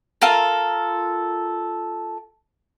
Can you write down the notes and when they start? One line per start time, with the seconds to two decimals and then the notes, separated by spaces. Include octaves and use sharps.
0.22 F4 A4 A#4